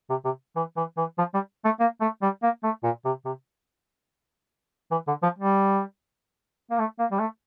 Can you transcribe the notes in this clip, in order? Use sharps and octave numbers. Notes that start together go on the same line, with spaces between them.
C3
C3
E3
E3
E3
F3
G3
A3
A#3
A3
G3
A#3
A3
A#2
C3
C3
E3
D3
F3
G3
A#3
A3
A#3
G3
A3